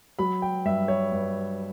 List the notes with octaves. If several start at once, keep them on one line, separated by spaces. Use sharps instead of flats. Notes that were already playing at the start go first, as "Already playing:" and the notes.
F#3 B5
G5
G2 E5
C#5
G2